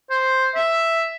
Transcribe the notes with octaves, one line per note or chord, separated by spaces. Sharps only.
C5
E5